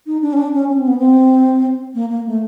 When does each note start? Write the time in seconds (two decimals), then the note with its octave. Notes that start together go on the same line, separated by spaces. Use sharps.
0.06 D#4
0.22 D4
0.33 C#4
0.37 D4
0.54 C#4
0.69 C#4
0.79 C4
0.87 B3
0.98 C4
1.95 A#3
2.10 A#3
2.27 A3